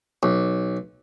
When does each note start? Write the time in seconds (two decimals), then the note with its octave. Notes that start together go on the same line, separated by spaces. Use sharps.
0.23 B1